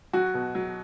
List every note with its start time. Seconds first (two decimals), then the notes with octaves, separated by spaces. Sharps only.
0.13 F#3 F#4
0.34 B2
0.55 F#3